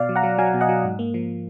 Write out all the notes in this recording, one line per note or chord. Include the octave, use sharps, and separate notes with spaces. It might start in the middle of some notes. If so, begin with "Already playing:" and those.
Already playing: B2 D5 F5
F#3
F#5 A#5
F#3
F#3 F5 G#5
B2
D#5 F#5
F#3
G#2
A#3
F3